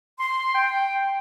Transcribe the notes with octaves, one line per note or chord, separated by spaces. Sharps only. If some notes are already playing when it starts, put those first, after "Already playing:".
C6
G5